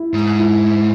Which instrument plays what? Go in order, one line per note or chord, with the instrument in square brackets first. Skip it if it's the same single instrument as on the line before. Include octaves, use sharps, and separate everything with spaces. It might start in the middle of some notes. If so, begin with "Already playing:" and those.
Already playing: [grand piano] E4
[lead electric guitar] G#2
[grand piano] E4